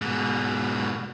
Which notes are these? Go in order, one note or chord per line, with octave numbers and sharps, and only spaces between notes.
G#2 B2